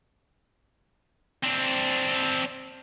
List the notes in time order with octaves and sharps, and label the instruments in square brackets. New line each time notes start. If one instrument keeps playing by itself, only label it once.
[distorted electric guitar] C4 D4